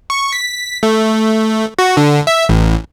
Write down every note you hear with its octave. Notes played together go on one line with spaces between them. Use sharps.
C#6
B6
A3
F#4
D3
E5
A1